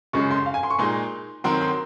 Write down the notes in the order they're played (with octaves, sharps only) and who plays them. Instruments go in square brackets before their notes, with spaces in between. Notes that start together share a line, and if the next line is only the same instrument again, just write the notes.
[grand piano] F#2 C#3 G#3 [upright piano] C#6
[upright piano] C6
F5
G#5
C6
C#6
[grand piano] A#2 G#3 D#4 [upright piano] C6
[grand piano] D#3 F#3 C4 F#4 A#4 [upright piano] C6
[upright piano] C6